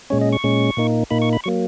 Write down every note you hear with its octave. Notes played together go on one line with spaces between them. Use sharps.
A#2 G#3 C#4 C#5
D#5
C#6
A#2 G#3 C#4
A#2 A#3 D#4
A#2 A#3 D#4 B5
C#6
B5
F#3 A#3 C#6